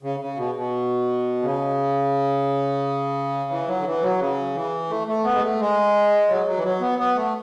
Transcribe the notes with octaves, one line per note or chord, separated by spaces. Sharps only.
C#3
C#3
B2
B2
C#3
E3
F#3
D3
E3
F#3
C#3
E3
A3
A3
B3
G#3
A3
G#3
F#3
F#3
E3
F#3
B3
B3
A3